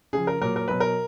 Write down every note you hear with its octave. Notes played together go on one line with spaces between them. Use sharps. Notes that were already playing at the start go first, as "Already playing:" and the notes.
C#3 F3 G#4
A#4
A#2 F#3 A#4
A#4
B2 F#3 B4
A#4